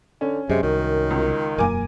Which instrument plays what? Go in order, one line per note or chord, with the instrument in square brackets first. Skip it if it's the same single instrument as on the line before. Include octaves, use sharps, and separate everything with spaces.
[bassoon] D3 [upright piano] C#4
[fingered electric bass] F#2 [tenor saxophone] C3 [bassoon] G#3
[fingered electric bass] C2 [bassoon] F#2 [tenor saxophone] D#3
[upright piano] C#2
[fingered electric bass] E1 F#2 A#3 [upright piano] A#4 G#5 D6